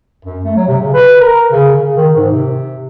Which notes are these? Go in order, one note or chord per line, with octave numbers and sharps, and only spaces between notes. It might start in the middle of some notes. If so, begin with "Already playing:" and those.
F#2
A3
F#3
C3
C#3
B4
A#4
C#3
C#3
D#3
G#2
C3